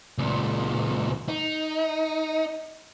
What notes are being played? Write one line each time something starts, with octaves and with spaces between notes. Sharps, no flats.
C#2 A#2
D#4